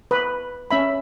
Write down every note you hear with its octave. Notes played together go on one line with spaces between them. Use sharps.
B4
C#4 E5 B5